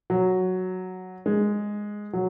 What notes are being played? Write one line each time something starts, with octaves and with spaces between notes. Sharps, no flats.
F#3
G#3
F#3